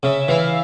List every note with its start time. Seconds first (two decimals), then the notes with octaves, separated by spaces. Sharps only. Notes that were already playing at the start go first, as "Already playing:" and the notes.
0.03 C#3 E5
0.28 E3 F5